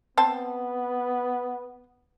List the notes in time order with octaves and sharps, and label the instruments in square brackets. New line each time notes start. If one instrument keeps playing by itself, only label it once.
[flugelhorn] B3 [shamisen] C4 C5 A5